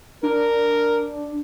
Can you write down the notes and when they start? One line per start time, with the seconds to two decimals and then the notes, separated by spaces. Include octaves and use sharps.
0.23 D4 A#4